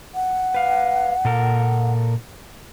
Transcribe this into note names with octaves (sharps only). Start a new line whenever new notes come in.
F#5
B4 F5
A#2 A4 A#4